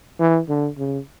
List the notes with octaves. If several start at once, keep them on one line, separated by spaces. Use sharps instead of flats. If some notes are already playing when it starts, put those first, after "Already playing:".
E3
D3
C#3